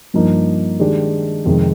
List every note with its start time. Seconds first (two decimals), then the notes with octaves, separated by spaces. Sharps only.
0.14 G2 F3 A#3 D#4
0.80 D#3 G#3 D4 G4
1.45 F2 C3 D#3 G#3